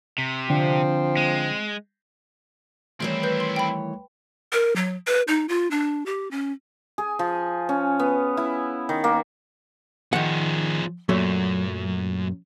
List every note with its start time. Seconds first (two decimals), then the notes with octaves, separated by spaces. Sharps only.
0.18 C3
0.50 D3 F3 C4 D4
1.17 G#3
3.00 D#3 E3 G3 A3 C4 E4 C#5
3.23 B4 G6
3.40 C6
3.56 G5 B5
4.52 A#4
4.76 F#3
5.07 B4
5.28 D#4
5.49 F4
5.71 D4
6.06 G4
6.31 C#4
6.98 G#4
7.19 F3
7.69 C#4
8.00 B3
8.37 E4
8.89 D#3
9.04 A#3
10.13 D#3 F3 G#4 F#5
11.09 F#2 A#2 F#3 A3